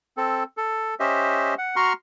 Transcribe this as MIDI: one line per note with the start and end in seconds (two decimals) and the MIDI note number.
0.17 0.43 60
0.17 0.43 69
0.57 0.94 69
1.00 1.54 61
1.00 1.54 67
1.00 1.54 72
1.00 1.54 75
1.00 1.54 76
1.58 1.76 78
1.76 1.93 66
1.76 1.93 82
1.76 1.93 84
1.76 1.93 85
1.76 1.93 89